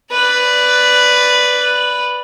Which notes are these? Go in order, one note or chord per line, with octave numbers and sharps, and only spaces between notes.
B4 D5